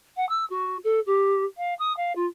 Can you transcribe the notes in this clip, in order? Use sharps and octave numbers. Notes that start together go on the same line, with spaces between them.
F#5
E6
F#4
A4
G4
F5
D#6
F5
F4